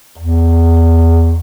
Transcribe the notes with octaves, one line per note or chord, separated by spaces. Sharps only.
E2